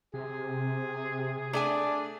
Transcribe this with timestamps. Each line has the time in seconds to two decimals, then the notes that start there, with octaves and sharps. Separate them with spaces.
0.14 C3 G#4
1.53 A3 D4 G#4 G#5